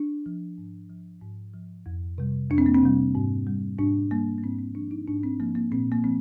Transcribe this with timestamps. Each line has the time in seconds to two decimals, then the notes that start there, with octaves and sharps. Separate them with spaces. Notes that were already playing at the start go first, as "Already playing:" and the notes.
Already playing: D4
0.26 F3
0.58 G#2
0.90 F3
1.22 G#2
1.54 F3
1.86 F2
2.18 C3 G3
2.50 F2 D4
2.58 C4
2.66 A#3
2.74 C4
2.82 C3 G3
3.15 G#2
3.47 G3
3.79 G#2 D4
4.11 G3 A#3
4.38 A#3
4.43 G#2 C4
4.59 C4
4.75 F3 D4
4.91 D#4
5.07 G#2 D4
5.23 C4
5.40 F3 A#3
5.55 A#3
5.72 A#2 C4
5.92 A#3
6.04 F3 C4